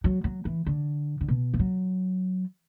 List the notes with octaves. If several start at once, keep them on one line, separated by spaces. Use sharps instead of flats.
F#3
F#3
E3
D3
D3
B2
E3
F#3